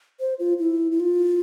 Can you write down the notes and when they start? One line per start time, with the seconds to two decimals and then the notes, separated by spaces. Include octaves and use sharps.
0.20 C5
0.39 F4
0.59 E4
0.92 E4
1.00 F4